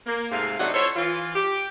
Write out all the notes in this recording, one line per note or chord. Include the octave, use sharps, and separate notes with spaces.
A#3
G#2 C3 A3 F5
C3 F#3 A3 D4 D#4 F#5
E4 F4 A4 C5 C#5
E3 F4
G4